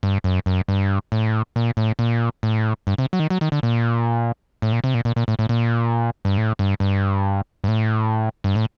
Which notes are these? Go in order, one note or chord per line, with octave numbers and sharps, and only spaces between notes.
G2
F#2
F#2
G2
A2
A#2
A2
A#2
A2
G2
C3
F#3
D#3
F#3
D#3
D3
A#2
A2
A#2
C3
A#2
A#2
A#2
A2
A2
A#2
G2
A2
G2
G2
G2
A2
G2
A2